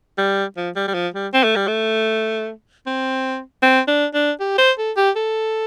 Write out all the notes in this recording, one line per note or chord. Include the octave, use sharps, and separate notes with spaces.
G3
F3
G3
G3
F3
G3
C4
A3
G3
A3
C4
C4
D4
D4
G4
C5
A4
G4
A4